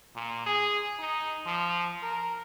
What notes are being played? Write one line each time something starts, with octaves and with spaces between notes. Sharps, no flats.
A#2
G#4
D#4
F3
A#4